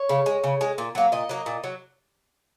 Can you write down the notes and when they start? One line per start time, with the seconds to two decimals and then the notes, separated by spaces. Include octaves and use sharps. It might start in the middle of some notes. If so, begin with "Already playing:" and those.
Already playing: C#5
0.09 C#3
0.26 G#3
0.44 C#3
0.61 G#3
0.78 A#2
0.95 F#3 A#3
1.12 A#2 D#5
1.29 F#3 A#3
1.46 A#2
1.64 F#3